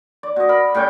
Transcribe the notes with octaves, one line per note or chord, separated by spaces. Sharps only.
D5
B2 D#5
A#4 B5
A2 G3 C#4 G5